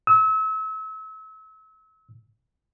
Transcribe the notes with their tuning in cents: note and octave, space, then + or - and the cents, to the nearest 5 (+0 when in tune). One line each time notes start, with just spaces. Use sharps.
E6 -35